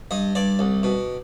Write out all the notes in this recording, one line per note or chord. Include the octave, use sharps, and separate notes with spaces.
G2 D#5
G2 D5
C2
B2